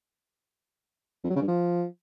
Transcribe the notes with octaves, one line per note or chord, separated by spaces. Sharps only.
F2
F#3
C#3
G2
F3